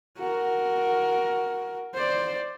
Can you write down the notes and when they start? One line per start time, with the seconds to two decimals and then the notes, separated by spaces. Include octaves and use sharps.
0.18 F#4 A#4
1.94 C5 D5